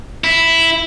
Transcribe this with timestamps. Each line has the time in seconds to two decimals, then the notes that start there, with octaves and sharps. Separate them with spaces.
0.24 E4